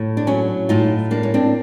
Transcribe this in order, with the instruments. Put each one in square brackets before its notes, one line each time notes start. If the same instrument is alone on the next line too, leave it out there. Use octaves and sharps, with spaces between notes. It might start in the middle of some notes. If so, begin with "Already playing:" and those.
Already playing: [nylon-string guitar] A2
D4
F#3 C#4
A2 D#4 F4
A#3 D4
C#4
C4 D4